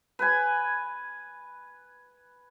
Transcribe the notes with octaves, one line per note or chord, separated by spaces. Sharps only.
B4 G#5